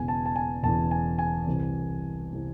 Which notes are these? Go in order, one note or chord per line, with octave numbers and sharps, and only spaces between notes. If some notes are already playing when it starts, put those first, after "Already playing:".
Already playing: E1 E2 C#3 E3 G#5
A5
A5
G#5
E1 E2 C#3 E3 A5
G#5
G#5
C2 C3 E3
C3 E3